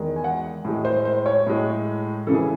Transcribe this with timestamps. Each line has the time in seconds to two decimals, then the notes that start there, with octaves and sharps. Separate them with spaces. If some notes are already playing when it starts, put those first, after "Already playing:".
Already playing: E2 D#3 G#3
0.16 G#5
0.24 F#5
0.65 A2 G#3
0.85 C5
1.05 C5
1.26 C#5
1.47 A2 G#3
2.27 C#3 E3 A4
2.34 G#4